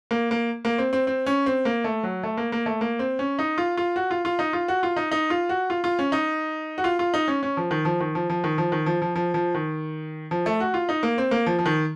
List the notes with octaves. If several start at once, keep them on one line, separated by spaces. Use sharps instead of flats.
A#3
A#3
A#3
C4
C4
C4
C#4
C4
A#3
A3
F#3
A3
A#3
A#3
A3
A#3
C4
C#4
D#4
F4
F4
F#4
F4
F4
D#4
F4
F#4
F4
D#4
D#4
F4
F#4
F4
F4
C#4
D#4
F#4
F4
F4
D#4
C#4
C#4
F3
D#3
F3
D#3
F3
F3
D#3
F3
D#3
F3
F3
F3
F3
D#3
F3
A3
F#4
F4
D#4
A#3
C4
A#3
F3
F3
D#3